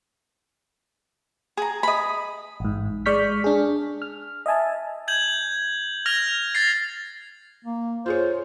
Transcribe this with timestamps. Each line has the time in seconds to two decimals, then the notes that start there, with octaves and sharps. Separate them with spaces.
1.57 G#4 A#5
1.83 D#5 B5
2.60 A1 G#2
3.06 G#3 D5 C#6 F6 G6 B6
3.44 D4 G#4
4.02 F6
4.46 D#5 E5 G#5 A5
5.08 G6 G#6 F#7
6.06 F6 G#6 A#6 F7
6.55 A6 A#6 C7
7.65 A#3
8.06 F4 G#4 C5 C#5